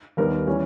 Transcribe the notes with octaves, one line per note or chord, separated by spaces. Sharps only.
D#2 D#3 G3 B3 A#4
E3 G3 C#4